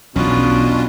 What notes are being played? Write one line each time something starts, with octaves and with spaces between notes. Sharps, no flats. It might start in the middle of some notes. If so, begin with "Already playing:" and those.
B1 E2 B2 C#4 D4 F4